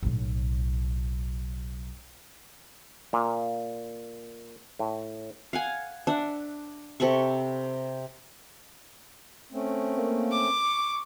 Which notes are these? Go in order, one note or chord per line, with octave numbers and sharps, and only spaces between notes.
B1 A2
A#2
A2
F5 F#5 G#5
D4 E5 F#5
C3 A4 B5 C#6
A3 C4 C#4
A#3
D6
C#6